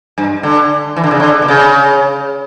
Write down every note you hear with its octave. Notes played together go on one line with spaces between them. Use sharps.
G2
D3
E3
D3
C#3
D3
B2
C#3